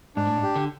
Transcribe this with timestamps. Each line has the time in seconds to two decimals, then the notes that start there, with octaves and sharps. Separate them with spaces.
0.16 G#2 D4
0.27 A2
0.37 G#2
0.43 G4
0.56 D3